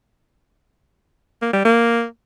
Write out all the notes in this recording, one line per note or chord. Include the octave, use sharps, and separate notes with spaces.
A#3
G3
A#3